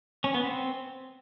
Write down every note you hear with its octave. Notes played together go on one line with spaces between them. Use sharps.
C#4
B3
C4